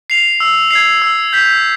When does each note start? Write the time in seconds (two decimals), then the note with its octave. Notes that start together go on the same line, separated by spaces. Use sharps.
0.10 C7 F7
0.40 E6
0.71 G#6 C7
1.02 E6
1.33 G6 B6